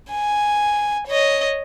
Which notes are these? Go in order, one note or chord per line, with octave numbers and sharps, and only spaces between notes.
G#5
C#5 D#5